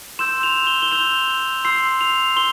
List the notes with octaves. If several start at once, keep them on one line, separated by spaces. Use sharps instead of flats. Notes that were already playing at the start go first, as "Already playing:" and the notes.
C6 E6 G6 E7
F7
G7
G7
C6 E6 G6 F7
C6 E6 G6 C7
F7
C6 G7